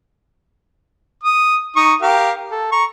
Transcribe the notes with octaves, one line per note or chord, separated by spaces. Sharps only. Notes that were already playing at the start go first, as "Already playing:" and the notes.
D#6
D#4 C#6 D#6
G4 A#4 F5
A4
A#5 C#6